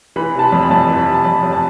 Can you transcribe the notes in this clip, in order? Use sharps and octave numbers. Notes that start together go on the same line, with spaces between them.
E3 B5
C3 A5
B5
F2
B5
F2 A5
E3
B5
C3
A5
F2 B5
F2
A5